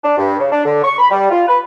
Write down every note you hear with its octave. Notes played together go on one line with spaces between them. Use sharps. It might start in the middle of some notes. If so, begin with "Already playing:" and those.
D4
G2
C#3
D4
D3
C#6
B5
G3
F4
B4